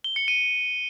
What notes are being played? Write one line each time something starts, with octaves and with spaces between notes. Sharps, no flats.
G7
C#7
D#7